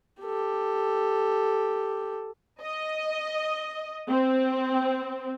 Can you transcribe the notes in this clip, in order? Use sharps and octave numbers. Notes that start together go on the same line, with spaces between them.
G4 A4
D#5
C4